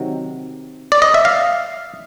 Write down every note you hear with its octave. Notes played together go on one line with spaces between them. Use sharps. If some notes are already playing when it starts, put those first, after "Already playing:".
Already playing: C3 D#3 F#3
D5
D#5
E5
F5